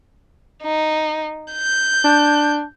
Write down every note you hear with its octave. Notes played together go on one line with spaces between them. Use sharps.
D#4
G6
D4